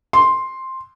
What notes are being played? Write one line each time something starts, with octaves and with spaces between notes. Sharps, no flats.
C6